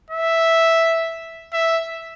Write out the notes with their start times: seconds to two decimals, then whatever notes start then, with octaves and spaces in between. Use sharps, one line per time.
0.10 E5
1.53 E5